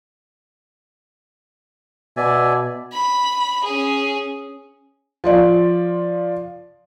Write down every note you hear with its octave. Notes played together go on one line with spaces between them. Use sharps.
B2 D5 E5 G#5
B5
C#4 G#4
F3 F4 D5